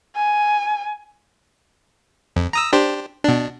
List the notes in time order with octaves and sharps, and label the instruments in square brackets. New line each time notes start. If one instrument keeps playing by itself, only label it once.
[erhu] G#5
[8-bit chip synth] F2
A#5 D#6 E6
D4 G4 C5
B2 D4